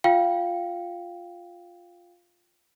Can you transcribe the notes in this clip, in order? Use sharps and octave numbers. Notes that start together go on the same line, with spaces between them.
F4 F5 G5